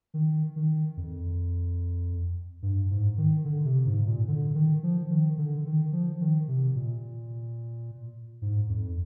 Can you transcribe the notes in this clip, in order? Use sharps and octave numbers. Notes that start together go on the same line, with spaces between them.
D#3
D#3
F2
G2
G#2
D#3
D3
C3
G#2
A#2
D3
D#3
F3
D#3
D3
D#3
F3
D#3
C3
A#2
G#2
F2